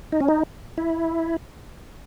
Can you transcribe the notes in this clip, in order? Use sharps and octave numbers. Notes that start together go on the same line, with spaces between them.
D#4
C#4
D#4
E4